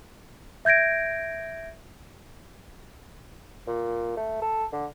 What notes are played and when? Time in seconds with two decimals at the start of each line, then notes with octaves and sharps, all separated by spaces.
0.65 E5 G6 G#6 A#6 D7
3.67 A#2
4.17 A3
4.42 A4
4.73 D3